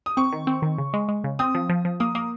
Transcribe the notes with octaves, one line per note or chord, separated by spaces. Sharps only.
D#6
C4 C#6
D#3
C4
D#3
C#3
G#3
G#3
C#3
C4 D#6
F3
F3
F3
A#3 D#6
A#3 D#6